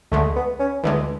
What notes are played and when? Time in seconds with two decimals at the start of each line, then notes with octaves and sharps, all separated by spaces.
0.12 D2 D3 G#3 A3
0.36 B3
0.60 C#4
0.83 D2 D3 E3 G#3